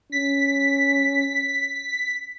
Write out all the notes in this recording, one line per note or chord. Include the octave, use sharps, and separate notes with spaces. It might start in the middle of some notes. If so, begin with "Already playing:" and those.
C#4 B6